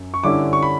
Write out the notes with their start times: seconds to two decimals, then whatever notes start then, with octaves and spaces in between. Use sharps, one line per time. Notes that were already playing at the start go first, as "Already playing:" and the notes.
Already playing: F#2
0.14 C#6
0.24 G2 D3 G3 C#4 E4 D6
0.53 C#6
0.63 B5